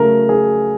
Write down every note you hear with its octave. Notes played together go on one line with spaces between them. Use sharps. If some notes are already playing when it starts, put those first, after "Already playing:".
Already playing: C#3 F#3 A3 A#4
G#4